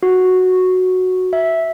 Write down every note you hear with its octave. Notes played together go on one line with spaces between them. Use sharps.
F#4
E5